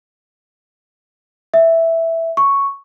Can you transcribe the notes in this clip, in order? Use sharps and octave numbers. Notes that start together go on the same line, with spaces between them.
E5
C#6